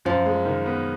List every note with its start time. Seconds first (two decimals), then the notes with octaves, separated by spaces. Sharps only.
0.05 F#2 F3
0.26 G#3
0.45 D#3
0.66 B3